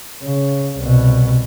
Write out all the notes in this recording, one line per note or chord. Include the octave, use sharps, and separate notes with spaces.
C#3
C2 B2